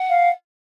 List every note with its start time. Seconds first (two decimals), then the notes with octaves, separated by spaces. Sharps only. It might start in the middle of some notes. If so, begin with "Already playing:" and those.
Already playing: F#5
0.10 F5